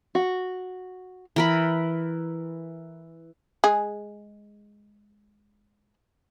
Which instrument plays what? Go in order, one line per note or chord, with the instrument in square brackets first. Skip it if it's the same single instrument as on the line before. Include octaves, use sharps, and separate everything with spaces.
[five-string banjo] F#4
[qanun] E3 A#4 B5
[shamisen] G#3 G#4